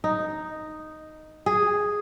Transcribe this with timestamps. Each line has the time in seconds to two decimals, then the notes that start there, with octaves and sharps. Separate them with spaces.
0.04 D#4
1.46 G#4